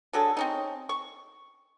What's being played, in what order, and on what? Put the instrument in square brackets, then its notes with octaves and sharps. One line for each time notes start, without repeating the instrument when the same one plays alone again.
[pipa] D3 F#3 G#4 A4
C4 C#4 D#4
C#6